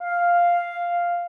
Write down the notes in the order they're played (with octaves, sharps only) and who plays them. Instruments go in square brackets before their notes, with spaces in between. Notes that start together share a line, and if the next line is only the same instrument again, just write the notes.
[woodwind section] F5